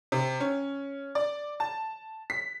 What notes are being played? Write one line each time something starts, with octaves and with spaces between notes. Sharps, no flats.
C3
C#4
D5
A5
B6